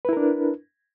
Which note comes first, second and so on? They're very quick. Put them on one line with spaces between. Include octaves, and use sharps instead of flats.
B4 E4 A#4 D4